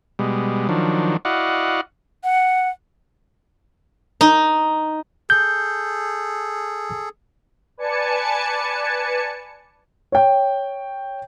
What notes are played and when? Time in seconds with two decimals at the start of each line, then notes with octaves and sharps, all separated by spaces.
0.19 B2 G3 G#3
0.69 D#3 F3 F#3 D4
1.25 E4 F#4 D5 D#5 F5 F#5
2.24 F#5
4.21 D#4
5.30 G#4 A4 G6
7.77 B4 D5 G#5 A5 C#7
10.12 C#5 G5